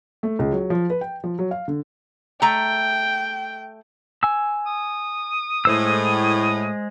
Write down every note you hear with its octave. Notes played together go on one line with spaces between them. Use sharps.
A3
C#2
F#3
F3
B4
G5
F3
F#3
F5
D3
A3 G5 A#5
G#5 E6
D#6
A2 G#3 C5 E6